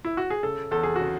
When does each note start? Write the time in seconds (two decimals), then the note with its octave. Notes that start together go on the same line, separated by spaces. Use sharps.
0.05 E4
0.17 F#4
0.30 G#4
0.43 C#3 A4
0.71 E2 A4
0.83 G#4
0.96 C#3 F#4